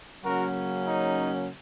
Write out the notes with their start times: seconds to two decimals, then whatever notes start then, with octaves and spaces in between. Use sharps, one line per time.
0.23 C#3 F#3 A#3 C#4 F#4 A#4
0.87 D#4